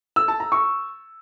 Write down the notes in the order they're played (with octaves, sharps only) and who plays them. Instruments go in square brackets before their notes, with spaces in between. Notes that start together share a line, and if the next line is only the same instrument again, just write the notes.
[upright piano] E6
A5
A#5
C#6